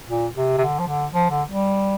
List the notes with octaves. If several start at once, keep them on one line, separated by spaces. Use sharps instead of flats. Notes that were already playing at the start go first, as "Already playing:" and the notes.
A#2
C3
C3
D3
F3
D3
F3
D3
G3